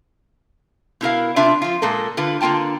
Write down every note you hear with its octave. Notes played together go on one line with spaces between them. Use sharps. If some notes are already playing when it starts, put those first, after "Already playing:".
B2 E4 A#4 F5
C3 D4 F4 E5
F3 F4
A#2 G#3 A4 A#4
D3 F4 B4
D3 A#3 F4 G5 A5